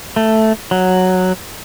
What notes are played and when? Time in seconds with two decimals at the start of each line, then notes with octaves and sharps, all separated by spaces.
0.16 A3
0.71 F#3